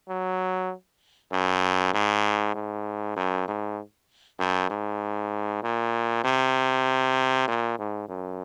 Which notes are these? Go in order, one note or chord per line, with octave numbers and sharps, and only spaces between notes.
F#3
F#2
G#2
G#2
F#2
G#2
F#2
G#2
A#2
C3
A#2
G#2
F#2